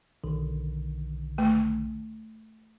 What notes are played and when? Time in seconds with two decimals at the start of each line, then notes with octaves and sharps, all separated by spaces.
0.24 B1 D3 D#3
1.38 A3